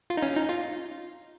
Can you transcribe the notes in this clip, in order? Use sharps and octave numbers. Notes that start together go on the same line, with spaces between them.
F4
D#4
C#4
D#4
F4